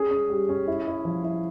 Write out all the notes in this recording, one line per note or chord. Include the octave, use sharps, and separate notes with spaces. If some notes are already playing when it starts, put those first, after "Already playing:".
Already playing: C#4 G#4
C#4
G3
C#4
E4
E4
F3
E4